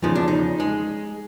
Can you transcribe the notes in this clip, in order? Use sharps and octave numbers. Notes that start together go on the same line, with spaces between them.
E2 C#3 F3 G#3 D#4
D4
D#4
G#3